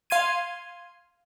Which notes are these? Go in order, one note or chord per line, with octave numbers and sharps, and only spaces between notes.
F5 C6 G#6 D#7